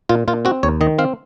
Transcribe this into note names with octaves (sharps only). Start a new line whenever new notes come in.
A#2 F4
A#2 F4
C4 F#4
D#2 C#5
D#3 D#5
C4 F5